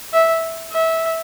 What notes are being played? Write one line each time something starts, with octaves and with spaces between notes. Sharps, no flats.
E5
E5